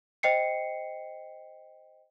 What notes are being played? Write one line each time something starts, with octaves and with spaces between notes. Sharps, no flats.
C5 D#5 G5 C7 C#7